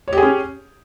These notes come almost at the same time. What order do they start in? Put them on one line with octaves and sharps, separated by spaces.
C#5 G4 G#4 C#4